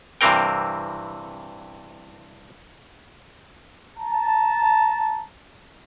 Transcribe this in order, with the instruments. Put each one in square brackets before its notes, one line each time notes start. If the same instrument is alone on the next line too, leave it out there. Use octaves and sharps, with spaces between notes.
[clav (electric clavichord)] G2 C3 E3 C4 A#4 G5
[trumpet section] A5 A#5